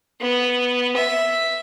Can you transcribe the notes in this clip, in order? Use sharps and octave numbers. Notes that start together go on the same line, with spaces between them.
B3
E5